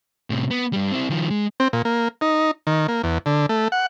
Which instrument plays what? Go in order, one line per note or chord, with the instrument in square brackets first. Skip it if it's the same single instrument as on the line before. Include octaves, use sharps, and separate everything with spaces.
[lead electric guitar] A2 C3
B3
G2 G3
C4 E4
D#3 F3
G#3
[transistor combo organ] C4
A#2
A#3
D#4
D#3
A#3
E2
D3
A3
F#5